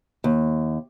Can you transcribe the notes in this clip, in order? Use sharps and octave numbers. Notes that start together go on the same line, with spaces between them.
D#2